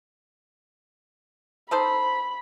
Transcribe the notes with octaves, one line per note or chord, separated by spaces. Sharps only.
D#4 A4 C5 B5